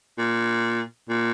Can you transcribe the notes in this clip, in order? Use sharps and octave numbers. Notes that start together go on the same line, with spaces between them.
A#2
A#2